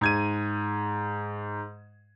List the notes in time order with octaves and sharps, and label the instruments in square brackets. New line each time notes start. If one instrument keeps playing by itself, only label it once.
[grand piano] G#2 G#6 D#7